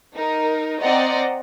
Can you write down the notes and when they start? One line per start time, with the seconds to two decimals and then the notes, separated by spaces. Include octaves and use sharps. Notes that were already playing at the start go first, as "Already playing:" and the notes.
0.15 D#4 A#4
0.81 C4 C5 D5 D#5 F#5 A#5